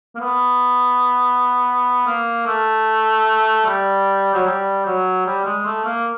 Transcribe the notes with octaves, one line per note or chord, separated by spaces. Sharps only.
A#3
B3
A#3
A3
G3
F#3
G3
F#3
G3
G#3
A3
A#3